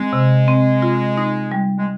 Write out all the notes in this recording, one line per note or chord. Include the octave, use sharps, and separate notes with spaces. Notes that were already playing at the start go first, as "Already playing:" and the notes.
Already playing: G#3 C4
C3
C4
F4
D#4
G3
G#3